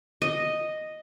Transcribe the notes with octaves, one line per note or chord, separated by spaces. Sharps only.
D#5